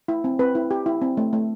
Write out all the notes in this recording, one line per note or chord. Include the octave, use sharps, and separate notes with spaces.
E4
C4
C4 B4
E4
G4
E4
C4
A3
A3